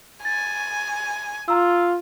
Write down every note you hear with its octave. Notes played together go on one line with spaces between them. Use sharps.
G#5 A6
F4 A#5 E6